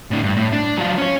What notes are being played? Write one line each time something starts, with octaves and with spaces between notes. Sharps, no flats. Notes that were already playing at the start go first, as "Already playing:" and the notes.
A2 D4
G2
A2
D4
F#3 F4
C#4 C#5